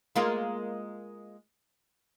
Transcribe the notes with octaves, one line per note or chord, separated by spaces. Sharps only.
G#3 A#3 F4